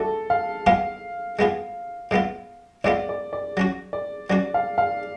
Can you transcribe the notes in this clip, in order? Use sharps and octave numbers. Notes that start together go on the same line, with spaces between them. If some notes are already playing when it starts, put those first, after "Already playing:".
Already playing: A3 D4 F#4 A4
F5
G#3 B3 F4 G#4 F5
G#3 B3 F4 G#4
A2 G#3 B3 F4
A2 G#3 B3 F4 D5
D5
D5
F#3 C#4 F#4
D5
F#3 C#4 F#4 D5
F5
F5